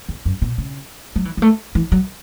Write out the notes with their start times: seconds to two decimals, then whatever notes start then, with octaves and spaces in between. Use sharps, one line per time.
0.09 E2
0.25 F#2
0.42 B2
0.58 C#3
1.16 F#3
1.25 E3
1.37 F#3
1.42 A3
1.75 E3
1.92 F#3